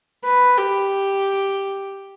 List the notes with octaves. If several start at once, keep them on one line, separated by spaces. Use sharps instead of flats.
B4
G4